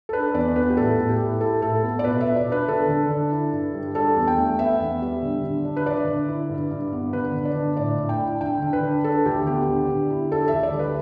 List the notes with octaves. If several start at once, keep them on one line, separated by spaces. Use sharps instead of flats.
A4
D4 B4
E2 D5
B3 B4
G4
A2 A4
A2
G4
E4
E4 A4
A2 A4
B3
D5
B2 B4
B2 E5
D5
D4
B4
D3 A4
D3
D4
E4
G2
G3
D4 A4
E2
G5
A3
B3 E5
E2
G3
D3
D3
D4
B4
D3 D5
D3
E4
G2
G2
B3
D3 B4
D3
D5
D4
A2 D5
A2
G5
E4
D3 G5
D3
B4
D4
D4 A4
D2 G4
B3 G4
D3
D3
E4
D4 A4
E5
D2
D5
G3
B4